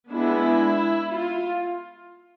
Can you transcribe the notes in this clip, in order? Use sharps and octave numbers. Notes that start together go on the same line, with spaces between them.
G#3 B3 D4 E4
F4